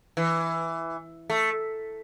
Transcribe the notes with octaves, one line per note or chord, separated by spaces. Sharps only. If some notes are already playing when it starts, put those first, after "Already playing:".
E3
A3